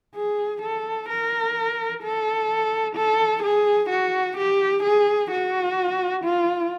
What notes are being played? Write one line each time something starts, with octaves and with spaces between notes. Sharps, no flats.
G#4
A4
A#4
A4
A4
G#4
F#4
G4
G#4
F#4
F4